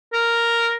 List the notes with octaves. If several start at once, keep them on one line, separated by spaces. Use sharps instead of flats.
A#4